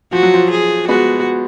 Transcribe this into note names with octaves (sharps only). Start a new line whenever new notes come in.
F3 F#4
F#3
F3
G#4
G#3 B3 F#4